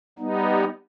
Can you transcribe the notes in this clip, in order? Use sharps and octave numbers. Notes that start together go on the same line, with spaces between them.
G3 B3 D#4